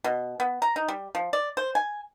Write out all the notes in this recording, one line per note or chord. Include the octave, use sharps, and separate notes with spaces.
B2
B3
A#5
D#4
G3
F3
D5
C5
G#5